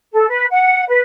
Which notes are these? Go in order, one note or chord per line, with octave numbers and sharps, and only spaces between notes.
A4
B4
F#5
B4